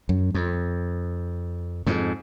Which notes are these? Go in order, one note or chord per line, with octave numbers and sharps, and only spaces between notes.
F#2
F2
F2 G#2